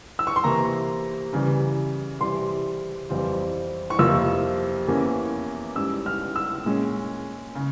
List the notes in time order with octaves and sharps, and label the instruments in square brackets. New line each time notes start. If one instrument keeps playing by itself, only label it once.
[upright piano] E6
C#6
C6
C3 E3 A#3 A#5
C#3 E3 G3
C3 E3 G3 C6
F2 E3 G3 C4 F4
C#6
F2 C3 F3 A#3 F4 E6
E2 E3 A#3 C#4
G#2 G3 C#4 E4 E6
F6
E6
A#2 G#3 C#4
C#3